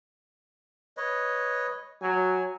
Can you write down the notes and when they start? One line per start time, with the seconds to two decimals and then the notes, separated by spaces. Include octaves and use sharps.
0.97 B4 C#5 D#5
2.02 F#3 G#5